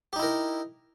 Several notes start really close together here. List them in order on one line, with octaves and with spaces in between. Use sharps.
G4 D#4 E4 A#4